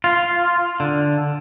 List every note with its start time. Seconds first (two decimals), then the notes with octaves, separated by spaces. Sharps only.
0.04 F4
0.80 D3